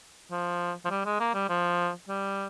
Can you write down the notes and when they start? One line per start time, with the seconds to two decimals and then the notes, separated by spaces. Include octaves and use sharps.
0.31 F3
0.85 F3
0.90 G3
1.05 G#3
1.20 A#3
1.34 G3
1.49 F3
2.09 G3